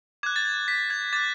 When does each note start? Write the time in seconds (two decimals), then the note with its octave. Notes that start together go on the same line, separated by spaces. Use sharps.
0.23 D6 F#6 G#6
0.36 A6
0.45 G#6
0.68 B6
0.90 G#6
1.13 D6 F#6 A6